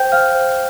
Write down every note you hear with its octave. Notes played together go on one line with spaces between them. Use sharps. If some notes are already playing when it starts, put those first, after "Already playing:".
Already playing: C5 G5 G6
C5 F5 F6
C5